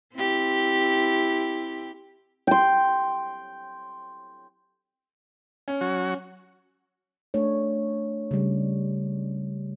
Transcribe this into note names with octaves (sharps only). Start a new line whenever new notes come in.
C4 E4 G4
G5 C6
C#4
F#3 F#4
A3 D4 C#5
C#3 G3